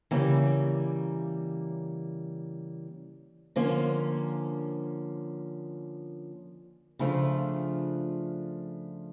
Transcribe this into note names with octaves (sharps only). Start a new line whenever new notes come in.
C#3 E3 G3 A#3
D3 F3 A#3 C#4
C#3 F3 A3 D4 F4